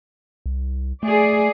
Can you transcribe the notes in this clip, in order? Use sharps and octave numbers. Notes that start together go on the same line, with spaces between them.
C2
A3 G#4 D5